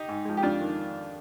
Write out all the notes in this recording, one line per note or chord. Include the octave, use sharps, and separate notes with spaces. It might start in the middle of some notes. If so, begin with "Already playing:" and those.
Already playing: D#4 G4
G#2
F3 G#3
G4
F2 D4 F4
D#3